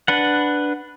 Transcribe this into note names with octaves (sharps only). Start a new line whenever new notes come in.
D4 B4 F#5